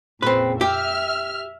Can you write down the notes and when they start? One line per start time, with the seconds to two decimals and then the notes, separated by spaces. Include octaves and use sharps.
0.22 F2 A#2 C#3 C4 B4
0.61 G4 E5 F6